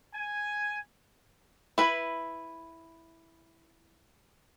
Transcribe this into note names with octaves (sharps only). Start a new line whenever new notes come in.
G#5
E4 B4